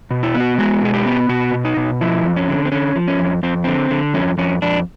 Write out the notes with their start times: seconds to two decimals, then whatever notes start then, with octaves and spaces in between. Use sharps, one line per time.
0.11 B2
0.23 E4
0.35 B3
0.40 F#4
0.58 G#3 F#4
0.82 B2 G#4
0.94 G4
1.06 B3
1.29 B2 F#4
1.53 B2
1.65 D#4
1.77 B2
2.01 F3 E4
2.25 F2
2.36 C#4
2.48 D3
2.65 C4
2.72 D3 C#4
2.96 F3
3.08 C#4
3.19 F2
3.43 F2 C4
3.64 D3 C4
3.91 D3
4.14 F2 C#4
4.38 F2 C#4
4.62 F2 D4